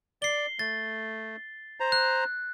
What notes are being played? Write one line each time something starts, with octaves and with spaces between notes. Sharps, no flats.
D5 C7 G7
A3 A6
C5 A#5
F#6